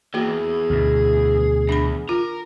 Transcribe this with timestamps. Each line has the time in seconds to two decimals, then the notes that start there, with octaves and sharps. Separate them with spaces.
0.14 E2 E3 A#3 F#4 G#4
0.70 D2 B2
1.69 E2 D4 B5
2.09 F4 A#4